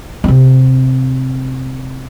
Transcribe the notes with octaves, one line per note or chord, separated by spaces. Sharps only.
C3 C4